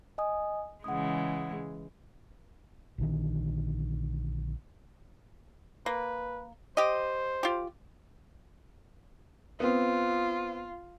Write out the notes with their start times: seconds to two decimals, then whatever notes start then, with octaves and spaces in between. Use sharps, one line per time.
0.18 D#5 G#5 D#6
0.84 C#3 E3 G#3 F#5 D#6
2.98 A#1 D3 D#3
5.86 A#3 B4
6.77 G4 C5 D#5
7.43 F4 G4
9.60 B3 C4 F4